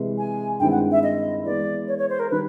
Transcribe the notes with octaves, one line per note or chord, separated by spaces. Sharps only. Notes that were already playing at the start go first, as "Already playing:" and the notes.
Already playing: C3 E3 G#3
G#5
G2 D#3 G#3 C4 E4 G5
F#5
E5
D#5
E3 G#3 B3 D5
C#5
C#5
C5
A#4
D#3 G3 B4